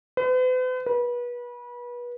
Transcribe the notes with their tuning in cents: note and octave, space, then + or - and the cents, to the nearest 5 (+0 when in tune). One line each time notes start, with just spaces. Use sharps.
B4 +45
B4 -30